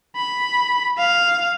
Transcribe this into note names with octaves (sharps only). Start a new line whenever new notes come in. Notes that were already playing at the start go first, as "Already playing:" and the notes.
B5
F5